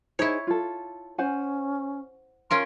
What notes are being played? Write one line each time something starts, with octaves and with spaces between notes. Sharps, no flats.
D#4 E4 G#4 C5 C#5
F4 A4
C#4 C5 F#5 G#5
C#4 F4 A#4 C6